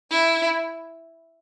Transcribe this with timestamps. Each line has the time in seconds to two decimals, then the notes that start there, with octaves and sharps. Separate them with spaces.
0.11 E4